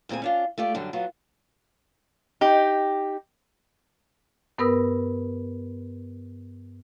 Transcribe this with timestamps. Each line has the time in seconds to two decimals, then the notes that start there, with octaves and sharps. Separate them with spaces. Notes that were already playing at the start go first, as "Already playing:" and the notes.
0.09 D2 A#2 C4 G#4 G#5
0.22 C#4 D4 F4
0.58 A3 F4 G4 D5
0.74 F#2 D3 F#3 G3 D4
0.93 F#3 B3 F4
2.41 D#4 G4
4.58 G2 B3 A#4 B4 D#6 E6